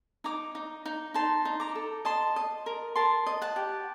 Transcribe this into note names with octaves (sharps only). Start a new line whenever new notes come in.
D#4 A#5 D6
D#4
D#4
D#4 A5 C6
D#4
A#5 D6
A4
D#5 A5 C6
D#5
A#4
A#4 A5 C6
D#5
F#5 A5
G4